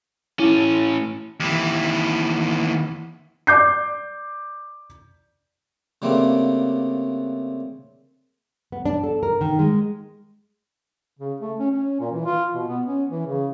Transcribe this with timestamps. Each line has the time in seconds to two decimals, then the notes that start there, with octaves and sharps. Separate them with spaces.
0.39 A2 C#4 E4
1.40 D#2 E3
3.47 D5 D6 G6 C7
6.02 C#3 G3 A3 A#3 C4 D4
8.72 B3
8.85 D4
9.04 A4
9.23 A#4
9.41 D#3
9.59 G#3
11.19 C#3
11.40 A3
11.59 C#4
11.71 C#4
12.00 A#2
12.12 E3
12.26 F4
12.54 B2
12.69 B3
12.86 C#4
13.10 E3
13.27 C#3